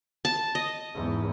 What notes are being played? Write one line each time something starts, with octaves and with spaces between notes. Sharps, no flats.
A5
D#5
E2 G#2